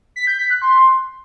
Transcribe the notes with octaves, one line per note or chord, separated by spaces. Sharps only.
B6
G6
B6
F#6
C6